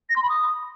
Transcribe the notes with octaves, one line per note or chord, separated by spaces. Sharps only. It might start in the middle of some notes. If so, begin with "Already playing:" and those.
A#6
C6
B5
D#6